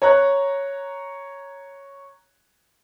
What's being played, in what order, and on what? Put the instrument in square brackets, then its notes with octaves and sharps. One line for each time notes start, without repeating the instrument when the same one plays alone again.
[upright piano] C#5 A#5 F#6